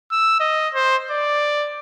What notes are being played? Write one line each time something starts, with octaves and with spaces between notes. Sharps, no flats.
E6
D#5
C5
D5